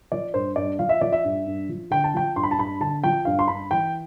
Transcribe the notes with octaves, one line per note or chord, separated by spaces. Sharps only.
F3 D5
G2 C5
G2 D5
F3 F5
E5
F3 D5
E5
G2
G2
F3
D3 G5
A5
F3 G5
G2 C6
B5
A5
G2 B5
D3 A5
F3 G5
G2 F5
C6
G2 B5
E3 G5